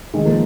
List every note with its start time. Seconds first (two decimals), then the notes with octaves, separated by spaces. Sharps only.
0.14 D#3 G#3
0.25 F3 A#3